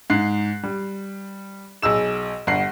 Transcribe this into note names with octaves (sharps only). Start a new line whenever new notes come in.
G#2 F#6 C7
G3
B1 G#4 E6 E7
G1 F#5 C7